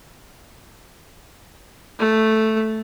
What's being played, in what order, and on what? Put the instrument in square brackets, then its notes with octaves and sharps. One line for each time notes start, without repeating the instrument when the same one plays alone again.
[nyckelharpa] A3